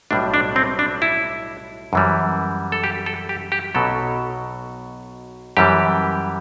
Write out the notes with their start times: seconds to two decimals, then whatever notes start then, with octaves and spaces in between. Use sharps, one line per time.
0.11 B1 A2 G3 D4
0.34 D4
0.56 C4
0.79 D4
1.02 E4
1.93 F#2 E3 G3
2.72 A4
2.84 G4
3.06 A4
3.29 G4
3.52 G4
3.75 B1 B2 F#3 A4
5.57 F#2 E3 G3 G4